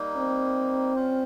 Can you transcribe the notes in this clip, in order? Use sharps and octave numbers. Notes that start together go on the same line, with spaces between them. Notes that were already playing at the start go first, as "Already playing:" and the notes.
Already playing: G3 A#3 D#4
C4
G3 C#4 F4 C5